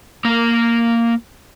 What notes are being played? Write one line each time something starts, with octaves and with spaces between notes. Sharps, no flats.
A#3 A#4